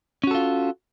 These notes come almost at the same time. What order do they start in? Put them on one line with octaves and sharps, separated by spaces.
C#4 F#4 A4 F4